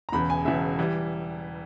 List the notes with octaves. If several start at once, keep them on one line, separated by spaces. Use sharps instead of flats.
A#5
E1 E2 C#3 B5
G#5
E1 E2 C#3 E5
E3 G3